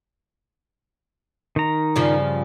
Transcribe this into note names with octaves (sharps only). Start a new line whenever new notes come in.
D#3 A#5
G2 C#3 F3